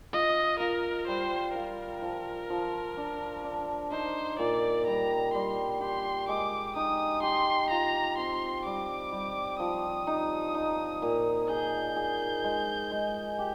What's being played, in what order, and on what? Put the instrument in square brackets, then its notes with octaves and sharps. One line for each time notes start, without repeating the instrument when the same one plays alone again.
[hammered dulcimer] F4 [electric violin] D#5
[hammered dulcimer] F4 [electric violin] A#4
[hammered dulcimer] G3 [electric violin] C5
[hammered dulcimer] F4 [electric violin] A#4
[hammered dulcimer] F3
F3
D4
D4
[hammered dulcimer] D#4 [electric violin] C5
[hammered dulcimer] A#2 [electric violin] D5
[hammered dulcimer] G3 [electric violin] A#5
[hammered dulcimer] G3 [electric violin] C6
[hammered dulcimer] G4 [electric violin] C6
[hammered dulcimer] G#3 [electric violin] D6
[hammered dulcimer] D#4 [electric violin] D#6
[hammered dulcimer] G4 [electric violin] C6
[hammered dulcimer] F4 [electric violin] A#5
[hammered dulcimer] C4 [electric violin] C6
[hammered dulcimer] G3 [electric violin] D6
[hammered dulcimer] G3
[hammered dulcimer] F3 [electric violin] D#6
[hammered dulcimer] D#4
D#4
A#2
[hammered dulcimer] G#4 [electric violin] G6
[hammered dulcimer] G#4
G#3
G#3
G4